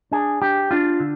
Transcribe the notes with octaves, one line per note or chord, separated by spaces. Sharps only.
D4 G#4
D4 G4
D4 F4
D3